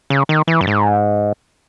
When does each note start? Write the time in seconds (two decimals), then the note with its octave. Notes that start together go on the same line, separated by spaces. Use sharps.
0.10 C#3
0.29 D#3
0.47 E3
0.61 F#2
0.67 G#2